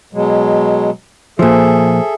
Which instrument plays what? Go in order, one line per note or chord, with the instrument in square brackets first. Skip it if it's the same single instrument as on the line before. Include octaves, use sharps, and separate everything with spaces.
[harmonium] B2 F#3 G#3
[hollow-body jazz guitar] A#2 F3 [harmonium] G#4 A4 E5